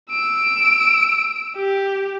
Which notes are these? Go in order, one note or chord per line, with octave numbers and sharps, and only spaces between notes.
E6 D7
G4